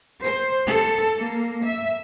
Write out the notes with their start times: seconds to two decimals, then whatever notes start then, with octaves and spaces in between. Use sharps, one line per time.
0.22 C5
0.67 A4
1.18 A#3
1.64 E5